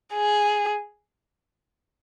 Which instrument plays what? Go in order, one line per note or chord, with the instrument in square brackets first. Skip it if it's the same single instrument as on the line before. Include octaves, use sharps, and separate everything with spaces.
[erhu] G#4